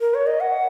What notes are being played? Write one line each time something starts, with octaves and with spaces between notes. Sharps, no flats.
A#4
C#5
D#5
F#5